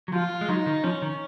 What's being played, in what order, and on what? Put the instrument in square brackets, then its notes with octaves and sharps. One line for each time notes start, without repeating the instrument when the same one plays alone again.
[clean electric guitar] F#3
[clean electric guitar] F3 [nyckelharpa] F4
[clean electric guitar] G#3
[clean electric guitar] F#3 [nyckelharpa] D#4
[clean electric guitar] D#3
[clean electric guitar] F3 [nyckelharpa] C#4
[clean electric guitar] D#3